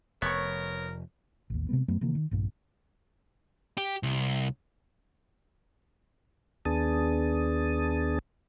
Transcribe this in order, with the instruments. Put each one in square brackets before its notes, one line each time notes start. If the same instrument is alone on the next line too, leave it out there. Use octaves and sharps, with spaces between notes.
[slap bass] F1 [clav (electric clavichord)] B3 [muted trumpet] A#4 [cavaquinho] C#5 C#6
[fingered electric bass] A1 D#2
C3 D#3 G#3 B3
F#2 F#3 A3 B3
C3 D#3 E3 A#3
D#3
A#1 G2 A#2
[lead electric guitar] G4
C2
[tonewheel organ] D#2 B3 D4 G#4 A5 D#6